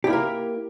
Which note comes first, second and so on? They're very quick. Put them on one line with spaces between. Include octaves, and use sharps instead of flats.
G4 E4 A#3 A#4